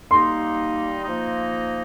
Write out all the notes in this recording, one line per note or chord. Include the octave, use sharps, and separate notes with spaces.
G3 A#3 D#4 C6
F3 A#3 D#4